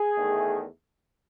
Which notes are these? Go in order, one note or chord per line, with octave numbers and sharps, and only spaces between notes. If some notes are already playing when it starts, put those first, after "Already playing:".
Already playing: G#4
E2 D#3 A3